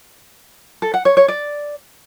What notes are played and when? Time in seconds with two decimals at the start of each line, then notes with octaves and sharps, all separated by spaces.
0.82 A4
0.94 F#5
1.05 C#5
1.17 C#5
1.28 D5